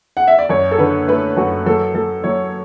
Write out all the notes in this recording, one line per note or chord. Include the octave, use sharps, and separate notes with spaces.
F#5
E5
D5
F#2 C#5
A4
D3 B4
A3 B4
F#2 F#4
F#3 A4
F#3 A4
F#3 C#5